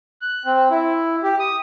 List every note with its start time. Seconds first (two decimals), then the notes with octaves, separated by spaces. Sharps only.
0.22 F#6
0.45 C4
0.71 E4
1.23 G4
1.40 D#6